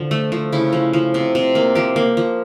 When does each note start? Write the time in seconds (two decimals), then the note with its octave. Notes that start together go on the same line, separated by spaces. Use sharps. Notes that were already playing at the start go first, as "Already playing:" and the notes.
Already playing: D3 F3
0.11 A3
0.32 F3
0.52 C#3 E4
0.73 F3
0.93 F3
1.14 C3
1.35 C3
1.55 A#3
1.75 F3 G4
1.96 A#3
2.17 F3